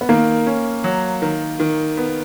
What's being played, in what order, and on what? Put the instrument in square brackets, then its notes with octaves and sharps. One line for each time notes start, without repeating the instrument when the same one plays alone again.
[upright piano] B3
[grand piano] D#3 [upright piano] A#3
[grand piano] C#4
F#3
D#3
D#3
B3